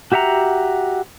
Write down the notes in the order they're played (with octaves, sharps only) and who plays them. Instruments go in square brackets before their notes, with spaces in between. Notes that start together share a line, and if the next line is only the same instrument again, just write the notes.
[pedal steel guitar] F#4 G4 E5 F#5 A#5